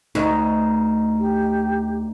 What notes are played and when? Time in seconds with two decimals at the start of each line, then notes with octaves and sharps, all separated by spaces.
0.15 D2 D#4
1.19 G4